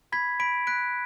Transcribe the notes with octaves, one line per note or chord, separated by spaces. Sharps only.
B5 G#6 B6
B5 B6 D7
F#6 B6 D7